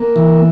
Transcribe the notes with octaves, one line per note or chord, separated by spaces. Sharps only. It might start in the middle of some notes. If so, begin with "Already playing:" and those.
Already playing: A#3
E3